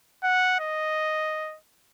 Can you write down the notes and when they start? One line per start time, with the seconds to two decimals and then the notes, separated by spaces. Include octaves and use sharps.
0.24 F#5
0.60 D#5